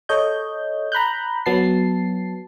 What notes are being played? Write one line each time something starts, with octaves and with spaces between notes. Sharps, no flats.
A4 C#5 D#5 G6
A#5 B5 F#6 G6
F#3 B3 A5 C7